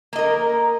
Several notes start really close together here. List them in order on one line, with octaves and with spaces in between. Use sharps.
A#3 D#5 A#4